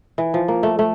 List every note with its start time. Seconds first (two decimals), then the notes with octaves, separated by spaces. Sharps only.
0.18 E3
0.34 F3
0.48 A#3
0.63 A3
0.79 A3